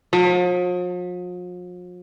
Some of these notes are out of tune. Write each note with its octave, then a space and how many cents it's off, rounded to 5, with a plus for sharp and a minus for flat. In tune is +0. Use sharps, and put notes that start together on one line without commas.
F3 +45